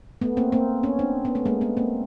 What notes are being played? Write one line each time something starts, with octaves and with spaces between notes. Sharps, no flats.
A3 B3
A#3 C4
A#3 C4
B3 C#4
C4 D4
B3 C#4
A3 B3
G#3 A#3
A3 B3
A#3 C4